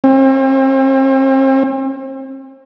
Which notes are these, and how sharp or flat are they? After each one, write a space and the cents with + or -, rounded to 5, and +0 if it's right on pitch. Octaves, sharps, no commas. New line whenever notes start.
C4 +40